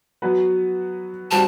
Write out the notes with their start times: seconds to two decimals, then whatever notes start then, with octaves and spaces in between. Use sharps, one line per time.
0.22 F#3 B3 F#4 B4
1.31 G3 C4 F#4 A5